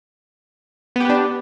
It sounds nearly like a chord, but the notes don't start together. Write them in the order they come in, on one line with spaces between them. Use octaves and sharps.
B3 G4 B4 D4